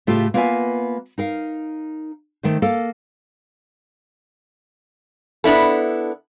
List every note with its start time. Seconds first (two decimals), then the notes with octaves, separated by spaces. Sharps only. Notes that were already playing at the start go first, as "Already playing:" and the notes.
0.07 A2 C#3 A3 F4 G4 A4
0.34 A#3 B3 F4 C5 E5 G#5
1.18 D#4 A#4 F5
2.43 D#3 A3 C5
2.62 A#3 A4
5.44 B3 D4 E4 A4